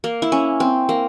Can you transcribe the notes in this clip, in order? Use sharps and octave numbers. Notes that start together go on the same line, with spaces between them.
A#3
E4
C#4
C4
A#3